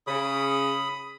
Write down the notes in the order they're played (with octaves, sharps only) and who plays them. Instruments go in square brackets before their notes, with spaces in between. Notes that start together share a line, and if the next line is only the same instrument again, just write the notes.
[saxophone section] C#3 [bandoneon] B5 D#6